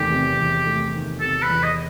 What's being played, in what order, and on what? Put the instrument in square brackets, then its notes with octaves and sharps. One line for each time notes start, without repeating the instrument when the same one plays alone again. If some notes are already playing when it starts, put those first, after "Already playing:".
Already playing: [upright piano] E2 C3 D#3 A3 [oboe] G4
[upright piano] C3
E2
A3
D#3
[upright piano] C3 [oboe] A4
[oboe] B4
[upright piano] E2
[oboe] D#5